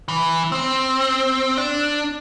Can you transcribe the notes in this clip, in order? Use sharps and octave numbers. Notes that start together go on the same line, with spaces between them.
E3
C4
D4